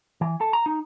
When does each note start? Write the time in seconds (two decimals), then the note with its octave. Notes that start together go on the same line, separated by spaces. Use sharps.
0.21 E3
0.41 A4
0.53 A#5
0.66 D#4